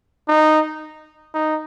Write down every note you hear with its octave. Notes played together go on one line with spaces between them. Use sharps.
D#4
D#4